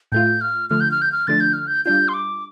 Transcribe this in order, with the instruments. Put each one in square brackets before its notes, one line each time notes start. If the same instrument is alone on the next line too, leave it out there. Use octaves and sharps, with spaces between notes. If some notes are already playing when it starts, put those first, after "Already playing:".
[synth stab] A2 A3 F4 [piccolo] G6
[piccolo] F6
[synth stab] D3 F3 A3 [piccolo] F6
[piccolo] G6
F6
G6
F6
[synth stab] D3 F3 A3 D4 [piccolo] A6
[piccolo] G6
F6
G6
[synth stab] G3 D4 F4 [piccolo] G6
[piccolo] C6
D6